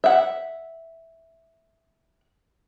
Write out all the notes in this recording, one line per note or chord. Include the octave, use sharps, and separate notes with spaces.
E5 F#5